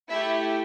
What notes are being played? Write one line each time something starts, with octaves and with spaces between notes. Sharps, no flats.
A3 E4 G4 E5